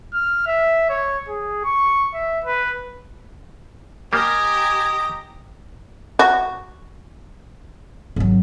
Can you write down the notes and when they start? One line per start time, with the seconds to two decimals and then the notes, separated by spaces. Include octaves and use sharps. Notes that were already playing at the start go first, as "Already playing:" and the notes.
0.14 F6
0.47 E5
0.90 C#5
1.28 G#4
1.65 C#6
2.14 E5
2.44 B4
4.13 G3 A#3 G4 D#5 G#5 A#5 A#6
6.19 F#4
8.16 G#1 F#3